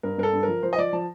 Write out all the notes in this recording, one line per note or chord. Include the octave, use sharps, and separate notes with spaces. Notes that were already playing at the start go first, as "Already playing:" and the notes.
G2 A#4
G2 A#4
A4
G2
F3 A#4
F3 C5
D#5
F3 D5
F3 A5